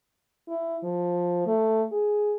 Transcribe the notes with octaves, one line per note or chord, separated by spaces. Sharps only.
E4
F3
A3
G#4